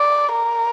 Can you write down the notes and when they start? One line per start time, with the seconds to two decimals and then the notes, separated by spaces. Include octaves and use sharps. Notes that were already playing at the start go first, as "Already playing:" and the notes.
Already playing: D5
0.32 A#4